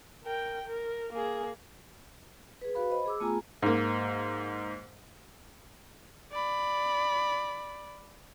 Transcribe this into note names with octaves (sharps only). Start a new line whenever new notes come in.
A#4 G5
A#4
A#3 G#4
G#4 B4
F#4 B4 F5 B5
C5 D#5 B5
G#4 D6 E6
A3 B3 F4 G#4 G#5 A#5
G#2 A#3
D5 B5